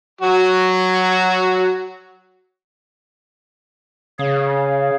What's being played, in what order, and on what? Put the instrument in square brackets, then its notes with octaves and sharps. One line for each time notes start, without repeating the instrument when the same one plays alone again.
[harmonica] F#3 F#4
[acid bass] C#3 [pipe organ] G#4 C#5 F5